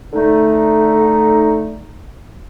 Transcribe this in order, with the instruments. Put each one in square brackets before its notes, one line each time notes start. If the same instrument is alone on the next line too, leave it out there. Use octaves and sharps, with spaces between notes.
[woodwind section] D3 A3 D#4